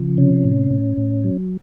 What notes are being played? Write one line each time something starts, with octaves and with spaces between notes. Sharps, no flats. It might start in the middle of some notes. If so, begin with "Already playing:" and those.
Already playing: C#3 F3
C3 C#4
A2
A2
A2
F#3